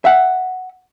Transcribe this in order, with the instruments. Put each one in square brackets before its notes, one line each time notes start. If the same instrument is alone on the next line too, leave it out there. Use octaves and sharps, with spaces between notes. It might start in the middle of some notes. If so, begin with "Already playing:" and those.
[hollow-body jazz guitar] E5 F#5